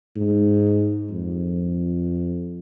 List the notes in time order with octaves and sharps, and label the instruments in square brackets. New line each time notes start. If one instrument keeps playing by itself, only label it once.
[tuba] G#2
F2